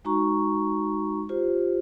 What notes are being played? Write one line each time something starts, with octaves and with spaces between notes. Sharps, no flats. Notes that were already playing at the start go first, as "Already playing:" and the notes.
G#3 D#4 F#4 A#5 C#6
F4 G4 C5